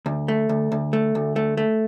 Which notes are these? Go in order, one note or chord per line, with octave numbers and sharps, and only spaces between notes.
D2
A3
D2
D2
A3
D2
A3
A3